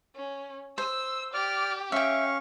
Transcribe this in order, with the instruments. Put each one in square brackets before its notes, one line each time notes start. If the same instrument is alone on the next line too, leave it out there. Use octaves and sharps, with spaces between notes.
[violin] C#4
[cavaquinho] C5 [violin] E6
[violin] G4 [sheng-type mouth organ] D5 D6 F6
[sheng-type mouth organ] C#4 F5 C#6 [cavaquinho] E5 G5